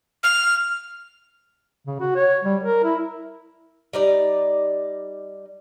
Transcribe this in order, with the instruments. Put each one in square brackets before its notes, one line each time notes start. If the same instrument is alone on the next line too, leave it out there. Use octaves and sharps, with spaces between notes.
[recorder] F6
[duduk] C#3
F#4
C#5
G3
A#4
E4
[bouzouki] G3 D#4 D5